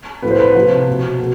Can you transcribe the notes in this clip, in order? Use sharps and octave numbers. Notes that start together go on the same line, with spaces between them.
A2 F3 B4
C5
B4
C3 F3
B2
B2